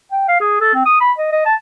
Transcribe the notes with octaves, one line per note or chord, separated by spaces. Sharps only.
G5
F5
G#4
A4
C4
D#6
B5
D#5
D#5
A5